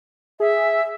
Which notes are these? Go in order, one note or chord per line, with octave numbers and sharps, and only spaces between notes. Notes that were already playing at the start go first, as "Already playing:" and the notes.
G#4 E5